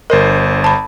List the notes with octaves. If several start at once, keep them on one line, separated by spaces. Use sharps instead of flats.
G1 A#4 C5 D#5
A5 B5